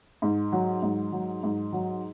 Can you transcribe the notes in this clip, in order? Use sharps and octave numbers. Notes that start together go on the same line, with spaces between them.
G#2
F#3
G#2
F#3
G#2
F#3